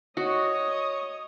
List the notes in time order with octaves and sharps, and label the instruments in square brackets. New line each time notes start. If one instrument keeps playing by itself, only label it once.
[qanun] F#4 [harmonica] C#5 [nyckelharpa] D#5 [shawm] D#6